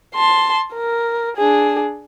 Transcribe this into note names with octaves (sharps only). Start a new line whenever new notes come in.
A5 C6
A#4
D4 G#4